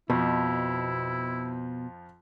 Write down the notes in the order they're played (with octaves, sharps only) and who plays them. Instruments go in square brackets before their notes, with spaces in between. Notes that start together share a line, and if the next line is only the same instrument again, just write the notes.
[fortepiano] F2 F3 [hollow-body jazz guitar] B2 [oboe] E4